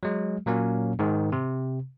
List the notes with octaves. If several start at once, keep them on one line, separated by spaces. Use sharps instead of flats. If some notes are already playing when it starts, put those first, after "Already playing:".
F#3 G#3
A#2 F#3 A#3 C#4
G#2 D#3 G#3
C3